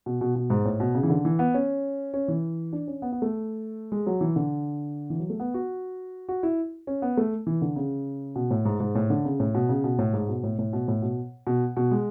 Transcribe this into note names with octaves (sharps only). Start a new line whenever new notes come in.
B2
B2
B2
G#2
A2
B2
C#3
E3
D3
E3
B3
C#4
C#4
E3
D4
C#4
B3
B3
A3
G#3
F#3
E3
D3
E3
F#3
A3
B3
F#4
F#4
E4
C#4
B3
A3
E3
D3
C#3
B2
A2
G#2
G#2
A2
D3
C#3
A2
B2
C#3
B2
A2
G#2
B2
A2
A2
B2
A2
B2
B2
B2
G#3